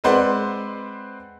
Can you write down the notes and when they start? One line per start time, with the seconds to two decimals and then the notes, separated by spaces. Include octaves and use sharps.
0.04 G#3 C4 B4 C5 D5 F#5